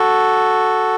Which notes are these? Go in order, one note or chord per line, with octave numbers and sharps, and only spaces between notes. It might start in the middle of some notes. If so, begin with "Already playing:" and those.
Already playing: F#4 A4